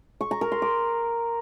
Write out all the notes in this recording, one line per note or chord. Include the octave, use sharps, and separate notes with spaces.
C#6
A#5
A#4
C6
D6